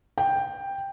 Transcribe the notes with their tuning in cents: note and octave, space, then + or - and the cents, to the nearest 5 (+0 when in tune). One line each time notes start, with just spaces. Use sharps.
G5 +5